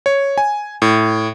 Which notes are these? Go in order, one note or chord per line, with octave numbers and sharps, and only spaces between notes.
C#5
G#5
A2